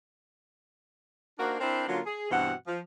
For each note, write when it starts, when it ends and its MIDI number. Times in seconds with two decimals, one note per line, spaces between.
1.38 1.55 58
1.38 1.55 62
1.38 1.55 63
1.38 1.55 66
1.38 1.55 70
1.38 1.55 72
1.59 1.86 60
1.59 1.86 62
1.59 1.86 64
1.59 1.86 70
1.59 1.86 72
1.87 1.99 50
1.87 1.99 54
1.87 1.99 58
1.87 1.99 61
1.87 1.99 65
2.05 2.28 68
2.29 2.52 43
2.29 2.52 47
2.29 2.52 52
2.29 2.52 60
2.29 2.52 66
2.29 2.52 78
2.66 2.78 53